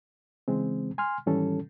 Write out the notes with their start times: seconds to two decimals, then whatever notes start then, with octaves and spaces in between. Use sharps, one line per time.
0.48 C#3 E3 G#3 C4
0.98 G#5 C6 F6
1.26 G#2 D#3 E3 G3 C#4 A4